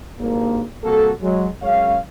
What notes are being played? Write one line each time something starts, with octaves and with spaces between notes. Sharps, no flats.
G#1 G2 A#3
C3 G3 A#3 F#4 A4
F#3 G#3
F#2 G#3 C#4 C#5 F5